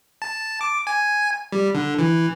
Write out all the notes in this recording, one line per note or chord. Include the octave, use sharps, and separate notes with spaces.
A5
D6
G#5
G3
D3
E3